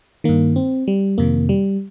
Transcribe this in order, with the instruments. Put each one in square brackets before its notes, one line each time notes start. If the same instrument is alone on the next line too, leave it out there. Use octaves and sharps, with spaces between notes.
[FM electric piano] G2 D#3 A#3
C4
G3
F2 C3 D#3 A#3
G3